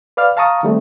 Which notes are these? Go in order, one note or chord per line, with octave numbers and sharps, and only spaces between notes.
B4 D5 F5 F6
F5 A5 A#5 C#6 D#6
D#3 G3 A3 C4